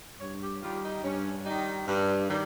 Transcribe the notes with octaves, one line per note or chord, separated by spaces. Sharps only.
G2 C#5
G4
D#3 G3 F4
D#4
G2 C#4
D#3 G3 D#4
G2
D#3 G3